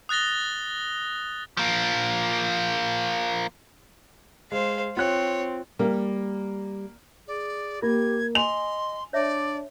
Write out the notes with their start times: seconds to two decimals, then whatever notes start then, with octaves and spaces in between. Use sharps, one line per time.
0.09 D#6 F#6 A6 A#6 G7
1.57 F3 A#3
4.52 G#3 C5 F5
4.97 C4 F4 C#5 F#6
5.79 G3 A#3
7.27 G#4 D5
7.82 A#3 F4 G4 G#6
8.35 D#5 G#5 C6 F7
9.13 D4 C#5 D5 E5